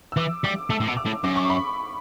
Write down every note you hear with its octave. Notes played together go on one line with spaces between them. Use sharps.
E6
E3 D6
G3 D6
A3 E6
A2
B2
D6
A2
F#2 D6
C#6
B5